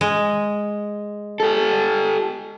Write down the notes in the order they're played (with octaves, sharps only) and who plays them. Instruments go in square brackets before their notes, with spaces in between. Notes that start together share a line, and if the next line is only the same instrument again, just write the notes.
[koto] G#3
[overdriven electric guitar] G4 A4